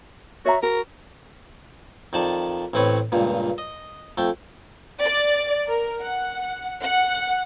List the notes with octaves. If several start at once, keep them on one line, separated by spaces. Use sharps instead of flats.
F#4 C#5 E5 A#5
F#4 A#4
F2 D#3 D5 A5
A1 A2 C4 B4 C#5
C#2 G2 A#2
D#5
F2 A3 G5
D5
A#4
F#5
F#5